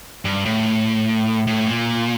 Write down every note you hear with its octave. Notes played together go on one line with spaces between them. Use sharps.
G2
A2
A2
A#2